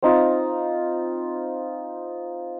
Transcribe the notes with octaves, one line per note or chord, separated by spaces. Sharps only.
C4 D#4 F4